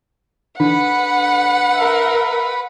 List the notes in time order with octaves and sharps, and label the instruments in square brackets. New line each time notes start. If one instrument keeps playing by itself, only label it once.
[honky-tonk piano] D3 [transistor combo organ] B4 [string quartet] F#5
[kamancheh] A#4 E5